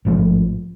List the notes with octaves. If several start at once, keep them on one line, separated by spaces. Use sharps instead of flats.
A1 G#2 F3 A3